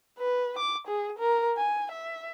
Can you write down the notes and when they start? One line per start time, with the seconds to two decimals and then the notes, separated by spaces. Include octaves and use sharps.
0.19 B4
0.59 D6
0.88 G#4
1.19 A#4
1.57 G#5
1.92 E5